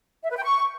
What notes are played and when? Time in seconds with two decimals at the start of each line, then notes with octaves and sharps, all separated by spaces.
0.24 E5
0.30 B4
0.37 G5
0.43 C#6